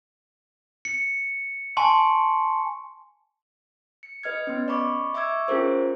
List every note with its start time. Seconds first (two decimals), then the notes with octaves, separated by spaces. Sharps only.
0.85 C#7
1.77 G#5 A5 C6 C#6
4.03 C#7
4.23 B4 D#5 F6 G#6
4.47 B3 C#4
4.68 D5 D#5 B5 C#6 D6
5.14 E5 C#6 D6 E6 G#6
5.48 C#4 F4 G#4 A#4 C5